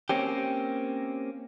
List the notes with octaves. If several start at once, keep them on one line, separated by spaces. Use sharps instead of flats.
A#3 C4 C#4 G4